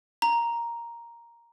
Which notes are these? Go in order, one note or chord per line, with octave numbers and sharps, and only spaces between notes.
A#5